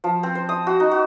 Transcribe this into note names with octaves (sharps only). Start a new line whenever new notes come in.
F3
C4
C5
D#6
F#4
D#4
F#4